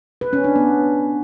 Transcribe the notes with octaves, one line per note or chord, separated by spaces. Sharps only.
B4
C#4
D4
B3